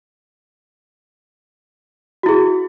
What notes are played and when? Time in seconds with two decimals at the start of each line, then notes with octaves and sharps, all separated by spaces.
2.23 F#4
2.26 E4
2.29 G#4